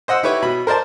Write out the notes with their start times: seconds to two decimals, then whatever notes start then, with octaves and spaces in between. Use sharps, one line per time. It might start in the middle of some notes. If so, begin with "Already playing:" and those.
0.08 C5 D#5 F#5 E6
0.23 E4 G4 B4 C#5 E5
0.42 B2 B5
0.67 A#4 C5 D5 A5